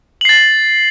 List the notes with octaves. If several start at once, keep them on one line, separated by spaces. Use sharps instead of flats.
A6 C7 F#7